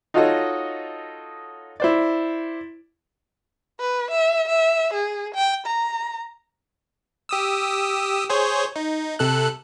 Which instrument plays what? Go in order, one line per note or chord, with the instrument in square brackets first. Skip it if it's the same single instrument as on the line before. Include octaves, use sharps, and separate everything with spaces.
[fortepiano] D#4 F4 F#4 A4 C#5 D#5
E4 C5 D5
[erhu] B4
E5
E5
G#4
G5
A#5
[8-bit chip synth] G4 D#6 E6
G#4 C5 C#5
D#4
C3 A4 F#6